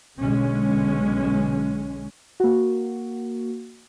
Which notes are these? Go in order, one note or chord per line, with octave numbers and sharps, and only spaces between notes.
B1 B2 D3 G#3 C#4
A#3 F#4